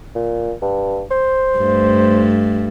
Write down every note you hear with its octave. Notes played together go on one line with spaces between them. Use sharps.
A#2
G2
C5
G2 A3